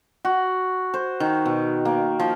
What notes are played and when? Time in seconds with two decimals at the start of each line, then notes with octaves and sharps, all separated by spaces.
0.25 F#4
0.94 C5
1.20 D#3
1.45 B2
1.85 A#3
2.19 F3